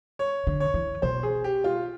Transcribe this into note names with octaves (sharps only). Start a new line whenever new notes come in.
C#5
D3
C#5
E3
B2 C5
G#4
G4
F4